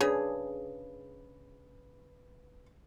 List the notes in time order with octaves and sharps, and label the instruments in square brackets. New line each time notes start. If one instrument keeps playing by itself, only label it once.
[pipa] C#3 [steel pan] D4 G#4 [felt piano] B4